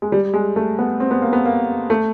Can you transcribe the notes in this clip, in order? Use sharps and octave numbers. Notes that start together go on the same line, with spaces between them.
G#3
G3
G#3
A3
B3
C4
B3
A#3
B3
A#3
A3